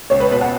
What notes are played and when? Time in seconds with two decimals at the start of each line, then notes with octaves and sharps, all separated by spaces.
0.10 C#2 C#5
0.20 B4
0.31 B2 B4
0.41 F#5